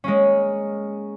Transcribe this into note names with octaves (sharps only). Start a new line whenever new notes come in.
G#3 A#3 C#4